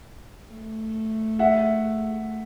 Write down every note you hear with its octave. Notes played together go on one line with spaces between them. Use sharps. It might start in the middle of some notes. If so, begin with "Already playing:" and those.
A3
E5 F#5